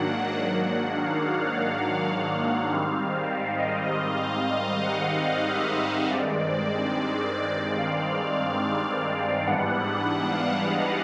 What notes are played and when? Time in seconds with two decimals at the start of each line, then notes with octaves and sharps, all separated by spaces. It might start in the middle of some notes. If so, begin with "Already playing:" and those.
Already playing: G#2 D#3 F#3 A#3 D4 F#5
1.03 F5
2.72 G#2 D#3 G3 C4
3.56 D#5
3.84 D#5
4.12 F5
4.40 F5
4.82 F#5
5.24 F5
5.52 E5
5.81 D#5
6.09 G2 D#3 G#3 C4 D5
6.51 D5
7.77 F5
9.46 G#2 E3 G3 B3 D4 F#5
10.31 F5
10.72 D#5